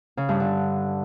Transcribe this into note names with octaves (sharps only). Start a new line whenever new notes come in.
C#3
G2
D3